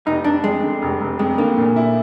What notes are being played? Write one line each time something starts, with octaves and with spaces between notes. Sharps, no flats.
F1 D#4
F1 D4
F2 G#3
D3
F1
F1
F2 G#3
D3 A#3
A#2
E4